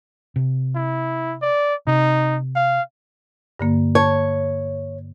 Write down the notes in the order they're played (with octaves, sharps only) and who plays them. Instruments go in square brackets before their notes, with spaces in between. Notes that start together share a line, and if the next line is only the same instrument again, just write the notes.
[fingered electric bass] C3
[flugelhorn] E4
D5
[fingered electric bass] C3 [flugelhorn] D#4
[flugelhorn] F5
[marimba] G2 D3 A#3
[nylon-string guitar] C#5 [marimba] A5